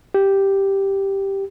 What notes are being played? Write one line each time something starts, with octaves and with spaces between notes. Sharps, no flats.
G4